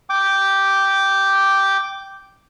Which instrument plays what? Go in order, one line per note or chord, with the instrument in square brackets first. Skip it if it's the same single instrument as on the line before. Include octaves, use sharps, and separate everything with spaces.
[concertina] G5 D6